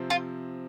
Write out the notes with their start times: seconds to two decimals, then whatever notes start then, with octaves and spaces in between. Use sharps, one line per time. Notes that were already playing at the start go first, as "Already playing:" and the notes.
Already playing: C3 F3 C4
0.10 F4